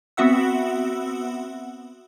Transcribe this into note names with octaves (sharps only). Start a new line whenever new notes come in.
B3 C4 F#4 E5 F#5 E6